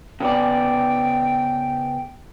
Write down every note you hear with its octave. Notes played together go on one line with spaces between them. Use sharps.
C#3 B3 D5 G5